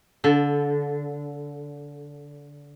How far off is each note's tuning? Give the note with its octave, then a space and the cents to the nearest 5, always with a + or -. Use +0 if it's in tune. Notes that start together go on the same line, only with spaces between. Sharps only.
D3 -25 A4 +0